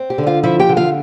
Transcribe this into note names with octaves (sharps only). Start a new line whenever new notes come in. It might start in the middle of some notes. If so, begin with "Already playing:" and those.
Already playing: C4
G4
D3
F4 F5
F3 E4 E5
G4 G5
D3
F4 F5